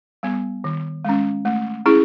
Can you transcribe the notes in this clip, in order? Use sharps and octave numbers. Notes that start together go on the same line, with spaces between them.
G3 B3
D#3
G#3 C#4
A3
C#4 E4 G#4